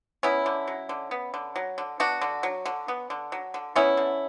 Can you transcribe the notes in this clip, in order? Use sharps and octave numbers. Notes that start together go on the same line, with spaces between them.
B3 C#4 E4
D3
F#3
D3
B3
D3
F#3
D3
B3 D4 F#4
D3
F#3
D3
B3
D3
F#3
D3
B3 C#4 E4
D3